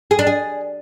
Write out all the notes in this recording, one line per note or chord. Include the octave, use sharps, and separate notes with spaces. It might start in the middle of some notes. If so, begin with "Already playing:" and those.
G#4
D4
G#4